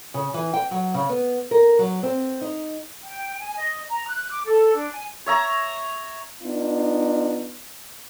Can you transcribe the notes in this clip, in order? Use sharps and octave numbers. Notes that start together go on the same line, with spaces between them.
C#3
E3
G5
F#3
C#3
B3
A#4
F#3
C4
D#4
G5
G#5
D#5
A#5
F#6
D6
A4
D4
G#5
C#5 E5 A#5
B3 D4 D#4 F4